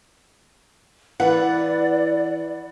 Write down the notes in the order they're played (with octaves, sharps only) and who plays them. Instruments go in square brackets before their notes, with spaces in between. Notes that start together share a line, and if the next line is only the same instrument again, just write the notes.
[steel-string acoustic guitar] E3 B4 [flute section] D5 [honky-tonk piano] F#5